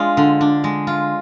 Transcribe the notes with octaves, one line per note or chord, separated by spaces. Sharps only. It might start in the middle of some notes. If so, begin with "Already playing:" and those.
Already playing: G#3 D4 F4
D3
D4
G#3
F4